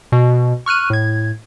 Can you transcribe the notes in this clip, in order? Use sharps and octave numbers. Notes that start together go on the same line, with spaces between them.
B2
C#6 F6 F#6 D#7
A2 G#6